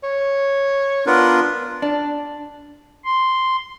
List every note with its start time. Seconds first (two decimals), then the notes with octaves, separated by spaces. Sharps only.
0.03 C#5
1.06 B3 D4 F4 A#4
1.82 D4
3.05 C6